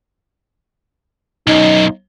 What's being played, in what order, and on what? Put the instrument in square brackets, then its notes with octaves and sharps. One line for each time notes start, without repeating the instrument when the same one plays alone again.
[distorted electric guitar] B1 F#2 [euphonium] D#4